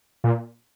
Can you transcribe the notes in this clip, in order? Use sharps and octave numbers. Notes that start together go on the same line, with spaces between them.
A#2